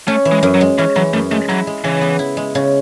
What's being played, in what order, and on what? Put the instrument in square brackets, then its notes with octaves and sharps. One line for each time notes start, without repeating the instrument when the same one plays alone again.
[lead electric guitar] A3 [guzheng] C#4
[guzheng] E3
[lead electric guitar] G#3
[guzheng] F#2
[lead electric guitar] F#3
[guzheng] G#3
[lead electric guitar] E3 [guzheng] C#4
[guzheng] E3 [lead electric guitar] F#3
[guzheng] F#2 [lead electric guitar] A3
[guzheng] G#3 [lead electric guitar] A3
[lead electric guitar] F#3 [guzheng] E4
[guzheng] G#3
[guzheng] C#3 [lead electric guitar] E3
[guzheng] B3
E4
G#3
C#3